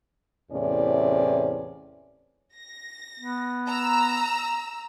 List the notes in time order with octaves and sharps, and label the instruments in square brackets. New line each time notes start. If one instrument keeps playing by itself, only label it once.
[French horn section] E2 A2 C3 C#4 D5
[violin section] A#6
[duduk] B3
[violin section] A#5 E6